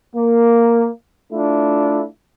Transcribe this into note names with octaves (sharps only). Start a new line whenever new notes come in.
A#3
A3 D4 E4 F4